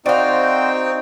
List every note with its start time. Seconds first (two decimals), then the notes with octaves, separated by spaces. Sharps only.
0.06 C4 D#4 F#4 C5 D5 F5 G5